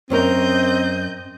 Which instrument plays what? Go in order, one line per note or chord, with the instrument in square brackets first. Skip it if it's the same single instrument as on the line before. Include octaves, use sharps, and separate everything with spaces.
[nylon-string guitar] F#2 C#4 A#4 [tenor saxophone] C4 [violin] D#5 G6